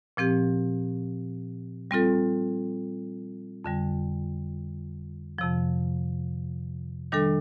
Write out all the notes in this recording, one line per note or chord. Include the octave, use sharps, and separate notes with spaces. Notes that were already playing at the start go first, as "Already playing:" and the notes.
A#2 F3 C4 G4
G3 C4 F4 A4
F2 D3 G3
F2 C3 F3
D#3 G3 D4 A4